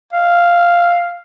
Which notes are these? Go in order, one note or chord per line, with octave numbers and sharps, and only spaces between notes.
F5